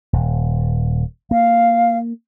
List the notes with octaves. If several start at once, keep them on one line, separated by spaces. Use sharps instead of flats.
D#1
A#3 F5